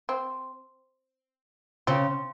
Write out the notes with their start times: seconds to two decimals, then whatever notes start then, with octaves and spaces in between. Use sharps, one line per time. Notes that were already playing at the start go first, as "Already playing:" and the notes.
0.09 C4
1.87 C#3 C4